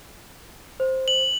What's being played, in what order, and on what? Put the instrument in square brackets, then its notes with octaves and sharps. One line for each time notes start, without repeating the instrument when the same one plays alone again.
[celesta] C5
[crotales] F#7